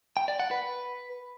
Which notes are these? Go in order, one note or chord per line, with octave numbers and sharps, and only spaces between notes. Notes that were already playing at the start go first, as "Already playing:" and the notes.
G5
D5
F#5
B4